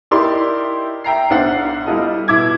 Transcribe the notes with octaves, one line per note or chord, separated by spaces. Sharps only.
D#4 E4 G4 A#4 D5 C6
E5 G5 A#5 C7
B1 D4 C5 E5 F#5 C7
G3 E4 F4 A4 D#5
B2 E4 D6 G#6